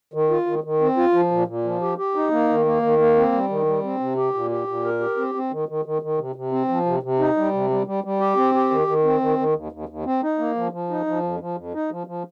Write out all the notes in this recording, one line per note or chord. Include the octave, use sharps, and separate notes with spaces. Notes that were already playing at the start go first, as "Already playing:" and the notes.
D#3
F4
D#3
D#3
C4
F4
F3
A#2
A#2
F3
G4
G4
D#4
A#3
D#3
A#3
D#3
A#3
C4
G3
D#3
G3
C4
C3
G4
A#2
G4
A#2
A#4
G4
C4
C4
D#3
D#3
D#3
D#3
C3
C3
C4
F3
C3
C3
D#4
G3
C3
G3
G3
G3
G4
C4
G4
D#3
D#3
C4
D#3
D#3
D#2
D#2
D#2
C4
D#4
A#3
F3
F3
D#4
F3
F2
F3
F2
D#4
F3
F3